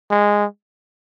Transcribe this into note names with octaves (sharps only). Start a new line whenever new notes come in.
G#3